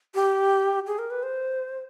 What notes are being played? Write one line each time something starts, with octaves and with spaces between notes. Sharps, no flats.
G4
G#4
A#4
B4
C5